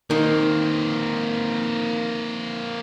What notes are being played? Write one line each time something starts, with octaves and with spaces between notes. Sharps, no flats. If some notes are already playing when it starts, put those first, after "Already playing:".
D#3 A#3 C4